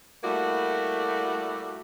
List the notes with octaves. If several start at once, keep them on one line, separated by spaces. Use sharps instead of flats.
G3 A3 A#3 E4 F#4 D5